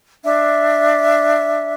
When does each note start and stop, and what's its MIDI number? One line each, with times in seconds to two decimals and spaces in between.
0.24 1.74 62
0.24 1.74 76